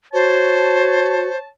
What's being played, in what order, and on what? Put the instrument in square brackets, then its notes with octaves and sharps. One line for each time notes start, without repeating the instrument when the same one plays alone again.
[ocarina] F#4 [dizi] C5 [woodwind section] C#5 A5